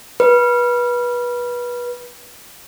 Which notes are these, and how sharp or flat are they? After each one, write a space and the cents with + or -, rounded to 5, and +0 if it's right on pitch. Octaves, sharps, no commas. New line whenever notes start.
B4 -25